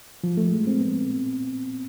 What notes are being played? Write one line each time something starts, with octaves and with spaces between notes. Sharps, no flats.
F3
A3
G#3
C4
B3